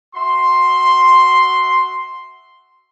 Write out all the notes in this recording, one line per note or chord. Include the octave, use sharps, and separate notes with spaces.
F#4 E5 C6